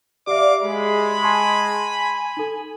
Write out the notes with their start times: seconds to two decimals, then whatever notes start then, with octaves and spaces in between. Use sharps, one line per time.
0.27 G4 D5 E5 F5 D6
0.63 G#3 B5
1.22 G#5 A5 C6 C#6
2.37 D#4 A4